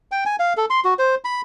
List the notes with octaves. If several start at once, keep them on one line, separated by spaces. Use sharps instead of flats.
G5
G#5
F5
A4
C6
F#4
C5
B5